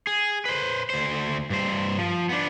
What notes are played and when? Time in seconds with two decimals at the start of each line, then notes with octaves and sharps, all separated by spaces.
0.07 G#4
0.45 B4 C5
0.90 D2 C5
1.50 G2 C5
1.98 F3
2.29 B3 D4